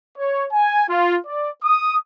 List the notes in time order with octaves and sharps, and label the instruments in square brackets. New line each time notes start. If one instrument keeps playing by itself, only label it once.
[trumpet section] C#5
G#5
F4
D5
D#6